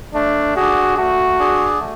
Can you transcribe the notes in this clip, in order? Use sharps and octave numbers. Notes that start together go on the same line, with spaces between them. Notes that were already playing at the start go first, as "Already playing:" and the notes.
A3 D4
D4 F#4 G#4
A3 F#4
D4 G#4
A3